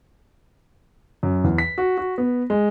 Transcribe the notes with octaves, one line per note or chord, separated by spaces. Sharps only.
F#2
E2
B6
F#4
F#4
B3
G#3